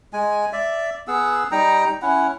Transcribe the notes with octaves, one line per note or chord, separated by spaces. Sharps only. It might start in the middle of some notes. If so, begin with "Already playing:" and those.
G#3 G#5
D5 E5
B3 G#4 F#5 E6
G3 D#4 G5 A#5
C#4 E4 F#5